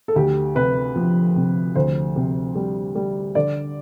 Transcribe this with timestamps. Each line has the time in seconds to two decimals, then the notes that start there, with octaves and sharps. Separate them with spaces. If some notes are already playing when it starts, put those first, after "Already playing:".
0.08 A4
0.16 D2 G4
0.55 C3 B4
0.96 F3
1.36 C3
1.75 D2 C5
2.16 C3
2.55 G3
2.95 G3
3.35 D3 D5